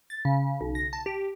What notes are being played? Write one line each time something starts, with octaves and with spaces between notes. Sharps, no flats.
A6
C#3
B1
A#6
A5
G4